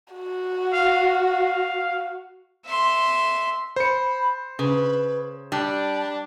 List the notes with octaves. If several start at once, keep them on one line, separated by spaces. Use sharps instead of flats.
F#4
F5
F5
E5 C6
C5 B5 C#7
C#3 B4
G3 D4 A5